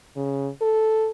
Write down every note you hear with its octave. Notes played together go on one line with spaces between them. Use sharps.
C#3
A4